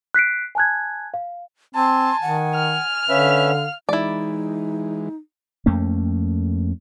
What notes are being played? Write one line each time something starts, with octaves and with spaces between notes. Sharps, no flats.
F#6 B6 C7 D7
G#5 A5 F#6 G#6
F5
C4 G#5 A5 C6
D#3 F#5
F6
D3 C#4 B4 E5 F5
E3 G#3 D#4 E4 D5
F2 A3 A#3 C#4